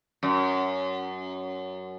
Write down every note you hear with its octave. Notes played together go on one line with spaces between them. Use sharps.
F#2